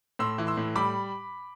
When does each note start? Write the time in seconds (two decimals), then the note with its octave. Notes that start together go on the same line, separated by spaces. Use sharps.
0.19 A2 C6 E6
0.38 E3
0.47 C6 E6
0.57 A2
0.75 G3 B5 D6